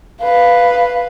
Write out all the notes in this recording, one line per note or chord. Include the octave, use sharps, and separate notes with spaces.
B4 F5